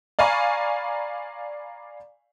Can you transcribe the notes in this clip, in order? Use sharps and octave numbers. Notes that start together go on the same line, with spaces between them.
D5 F5 G#5 A#5 B5 C#6